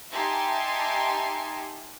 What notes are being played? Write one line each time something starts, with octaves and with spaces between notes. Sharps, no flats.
D#4 G4 E5 G#5 A5 C6